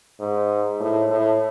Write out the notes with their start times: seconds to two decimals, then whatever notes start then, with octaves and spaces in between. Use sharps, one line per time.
0.20 G#2
0.80 A2
1.10 A2